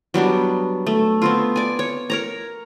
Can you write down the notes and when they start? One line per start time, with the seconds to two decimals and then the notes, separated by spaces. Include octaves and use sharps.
0.14 F#3 G3 B3 D4
0.87 A3
1.22 B3 C4 F4
1.56 D5 G#5
1.79 C#5
2.10 A#4 C#5 A#5